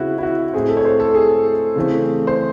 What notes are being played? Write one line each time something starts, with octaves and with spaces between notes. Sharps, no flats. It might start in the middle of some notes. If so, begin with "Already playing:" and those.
Already playing: C#3 G#3 C4 E4 F#4
E4
F#4
A2 G#3 C4 G#4
A4
C#5
C5
A4
G#4
C#3 E3 A3 C4
C5